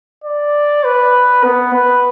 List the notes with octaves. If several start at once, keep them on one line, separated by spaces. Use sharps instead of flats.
D5
B4
B3
B4